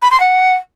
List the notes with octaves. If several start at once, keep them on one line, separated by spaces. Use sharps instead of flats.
B5
C6
F#5